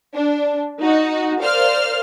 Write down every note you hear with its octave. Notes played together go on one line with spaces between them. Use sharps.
D4
D#4 F#4
A#4 C5 D5 F5 F6